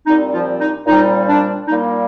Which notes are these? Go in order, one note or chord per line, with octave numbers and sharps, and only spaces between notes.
A#2 G3 C4 D#4
F3 F4
D#4
A#2 G3 C4 D#4
D4
A#2 G3 A#3 D#4